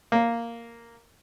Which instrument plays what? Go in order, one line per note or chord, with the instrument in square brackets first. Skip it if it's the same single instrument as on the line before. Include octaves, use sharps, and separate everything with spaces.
[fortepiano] A#3